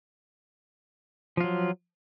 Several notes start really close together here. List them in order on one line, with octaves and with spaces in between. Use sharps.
F3 F4 F#3